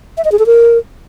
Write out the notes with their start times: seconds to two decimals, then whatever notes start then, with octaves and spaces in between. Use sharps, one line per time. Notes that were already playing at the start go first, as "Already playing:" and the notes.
0.17 E5
0.25 D#5
0.32 G#4
0.39 A4
0.46 A#4